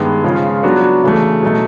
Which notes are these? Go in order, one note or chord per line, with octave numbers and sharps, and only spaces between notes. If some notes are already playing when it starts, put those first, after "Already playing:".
Already playing: G2 D#3 G#3 B3
C#3 F3 G#3 C#4 F4
F#3 B3 D4 F#4
C#3 E3 A3
B2 F#3 A3